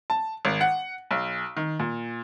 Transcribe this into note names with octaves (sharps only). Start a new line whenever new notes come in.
A5
G#1
F#5
B1
D#3
A#2